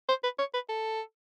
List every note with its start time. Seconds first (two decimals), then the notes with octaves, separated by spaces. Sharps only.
0.08 C5
0.24 B4
0.39 C#5
0.54 B4
0.69 A4